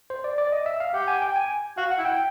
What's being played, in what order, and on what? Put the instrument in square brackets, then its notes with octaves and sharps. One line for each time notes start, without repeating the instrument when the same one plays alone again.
[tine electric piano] C5
D5
D5
D#5
E5
F5
[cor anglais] G4 [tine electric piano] F#5
[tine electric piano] G#5
G5
G#5
[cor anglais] F#4 [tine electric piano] F5
[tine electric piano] F#5
[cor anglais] E4
[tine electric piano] G5